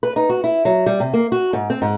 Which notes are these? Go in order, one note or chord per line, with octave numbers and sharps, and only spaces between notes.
B4
D#4
F#4
E4
F#3
G3
C3
A#3
F#4
G#2
C4
G#2